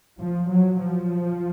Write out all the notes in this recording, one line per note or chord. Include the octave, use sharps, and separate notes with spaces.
F3
F#3
F3